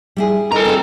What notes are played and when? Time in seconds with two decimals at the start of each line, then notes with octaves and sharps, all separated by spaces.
0.16 G3 E4 G#4
0.52 A4 A#4 D#5 A#5
0.65 C4 F4